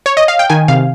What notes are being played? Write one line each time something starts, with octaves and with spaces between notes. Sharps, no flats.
C#5
D#5
F5
G5
D#3 G#5
C3 F5